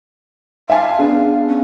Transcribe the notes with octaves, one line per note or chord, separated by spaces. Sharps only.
E5 F5 G#5 A5
B3 D4 G#4
C#4